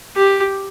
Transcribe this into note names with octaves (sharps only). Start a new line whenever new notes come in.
G4